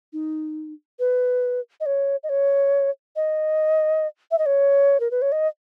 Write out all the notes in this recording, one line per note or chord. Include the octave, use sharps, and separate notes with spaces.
D#4
B4
D#5
C#5
D#5
C#5
D#5
E5
D#5
C#5
A#4
B4
C#5
D#5